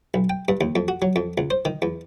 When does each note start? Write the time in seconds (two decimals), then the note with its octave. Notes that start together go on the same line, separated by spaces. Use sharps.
0.14 B1
0.30 G5
0.48 G2
0.61 D#2
0.76 F2
0.88 F#4
1.02 F#3
1.16 F2
1.38 C#2
1.51 C5
1.65 D#3
1.82 E2